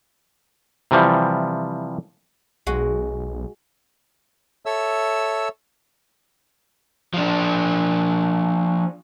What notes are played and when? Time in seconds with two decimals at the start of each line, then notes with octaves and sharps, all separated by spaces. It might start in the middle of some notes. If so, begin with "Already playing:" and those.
0.91 C3 E3 F3 G3
2.67 B1 G#3 F#4
4.66 A4 C#5 E5 E6
7.14 F3 D4